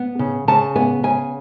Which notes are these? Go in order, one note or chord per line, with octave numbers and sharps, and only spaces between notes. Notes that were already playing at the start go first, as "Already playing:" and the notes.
Already playing: B3
C#3
C#3 A5
B3 G#5
C#3 G#5